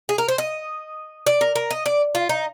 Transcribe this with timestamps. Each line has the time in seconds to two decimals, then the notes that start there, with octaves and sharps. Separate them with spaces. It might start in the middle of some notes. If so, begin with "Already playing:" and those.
0.09 G#4
0.18 A#4
0.28 C5
0.38 D#5
1.27 D5
1.41 A#4
1.56 A#4
1.71 D#5
1.86 D5
2.15 F4
2.29 D#4